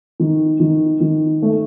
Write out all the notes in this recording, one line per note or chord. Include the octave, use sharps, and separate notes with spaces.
D#3
D#3
D#3
A3